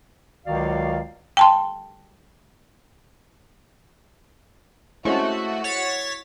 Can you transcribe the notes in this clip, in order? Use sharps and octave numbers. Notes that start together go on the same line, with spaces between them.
C#2 D#3 F#3 F#4 D5 F5
G5 A5 C6
G#3 A3 C4 C#4 E4 F#4
C#5 A6 B6